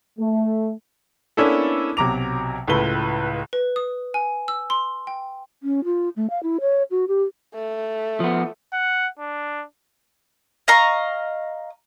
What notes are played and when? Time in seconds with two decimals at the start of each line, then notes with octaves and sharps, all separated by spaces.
0.19 A3
1.37 A#3 B3 C#4 D4 E4 A4
1.97 B1 C3 F#3 A#5 D6 F7
2.67 C#2 A2 A3 F4 B4 G7
3.53 B4
3.76 D#6
4.14 G#5
4.48 E6
4.70 C6
5.07 G5
5.63 C#4
5.84 F4
6.16 A3
6.30 F5
6.43 E4
6.61 C#5
6.91 F#4
7.08 G4
7.54 A3
8.20 F3 B3
8.73 F#5
9.19 D4
10.68 D#5 F5 A#5 C#6